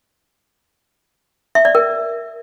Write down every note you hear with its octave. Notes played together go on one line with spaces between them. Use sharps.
E5
D5
A#4